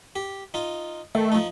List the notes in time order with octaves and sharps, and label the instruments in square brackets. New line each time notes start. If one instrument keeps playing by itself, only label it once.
[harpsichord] G4
D#4 F4
[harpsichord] D#3 [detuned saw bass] A3
[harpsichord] F3 D#4